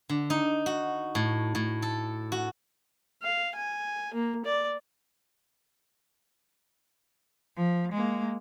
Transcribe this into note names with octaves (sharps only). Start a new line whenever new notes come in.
D3
D#4
F#4
A2
A2
A4
F#4
F5
G#5
A#3
D5
F3
G#3 A#3